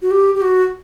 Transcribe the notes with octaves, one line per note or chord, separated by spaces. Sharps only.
F#4
G4
G4
F#4